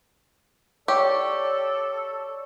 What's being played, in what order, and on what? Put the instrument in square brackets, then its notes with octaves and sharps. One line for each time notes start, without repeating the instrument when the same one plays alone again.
[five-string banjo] G4 [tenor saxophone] A4 [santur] C#5 [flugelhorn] D5